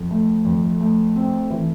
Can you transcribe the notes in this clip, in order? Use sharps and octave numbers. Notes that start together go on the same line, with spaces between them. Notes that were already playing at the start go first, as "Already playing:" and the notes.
Already playing: F2
A3
F2
A3
C4
E3